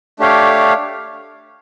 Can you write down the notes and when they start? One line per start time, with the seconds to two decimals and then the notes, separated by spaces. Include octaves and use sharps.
0.19 A3 D4 G4 C#5 F5